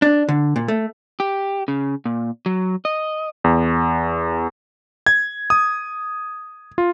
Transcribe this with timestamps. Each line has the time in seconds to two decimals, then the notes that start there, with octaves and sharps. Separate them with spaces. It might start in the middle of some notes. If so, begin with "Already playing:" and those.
0.02 D4
0.29 D3
0.56 A#2
0.68 A3
1.20 G4
1.68 C#3
2.05 A#2
2.46 F#3
2.85 D#5
3.44 E2
5.06 G#6
5.50 D#6
6.78 F4